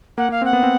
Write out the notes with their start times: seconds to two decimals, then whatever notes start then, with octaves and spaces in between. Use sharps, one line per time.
0.17 A#3 F#5
0.29 A#3 F5
0.42 C4 F#5
0.53 B3
0.63 C4